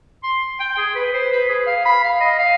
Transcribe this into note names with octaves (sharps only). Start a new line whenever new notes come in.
C6
G5
G#4
B4
C5
B4
G#4
F5
B5
F5
D#5
F5